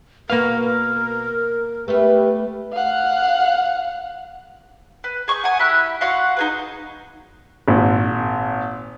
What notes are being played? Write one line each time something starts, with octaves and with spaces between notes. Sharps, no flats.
B2 A#3 F#4 A#4 B4 F5
A3 B3 G4 B4
F5 F#5
B4
G#4 C#6 D#6 G6
F#5 G#5
E4 G4 B5 F#6
F#4 F5 F#5 C6
D#4 G#4 B4
G#1 A#2